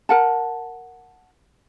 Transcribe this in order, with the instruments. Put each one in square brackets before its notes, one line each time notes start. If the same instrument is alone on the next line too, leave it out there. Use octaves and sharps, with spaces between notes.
[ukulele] A#4 F#5 A5